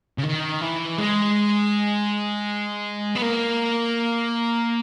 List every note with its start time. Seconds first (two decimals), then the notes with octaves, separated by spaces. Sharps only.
0.18 C#3
0.24 D#3
0.61 E3
0.98 G#3
3.16 B3
3.22 A#3